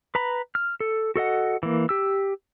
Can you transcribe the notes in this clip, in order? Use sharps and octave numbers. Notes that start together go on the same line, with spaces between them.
B4 A#5 B5
F6
A4
F#4 A4 D#5 F#5
E3 A#3
G4 E6